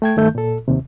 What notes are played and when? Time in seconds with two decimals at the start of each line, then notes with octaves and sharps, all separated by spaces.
0.02 A3 G5 G#6
0.16 G2 D#3 A3 G6
0.35 A#2 A4
0.68 D#2 C3